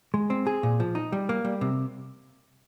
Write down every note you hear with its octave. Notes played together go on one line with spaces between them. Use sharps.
G#3
C4
G#4
A#2
F3
D#4
G3
A#3
G3
C3